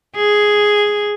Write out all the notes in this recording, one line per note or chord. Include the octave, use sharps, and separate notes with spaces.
G#4